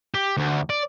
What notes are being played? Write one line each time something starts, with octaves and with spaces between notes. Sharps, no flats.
G4
D2
D5